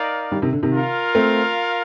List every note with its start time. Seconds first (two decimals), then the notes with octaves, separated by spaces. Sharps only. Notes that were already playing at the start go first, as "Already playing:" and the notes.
Already playing: D#4 A#4 D5 F5
0.32 D#3 G3
0.42 C3 D#3
0.53 D3
0.63 C3 D#3
0.73 F4 A#4 F5
1.15 A3 C4